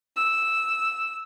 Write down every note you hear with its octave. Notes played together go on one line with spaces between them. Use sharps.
E6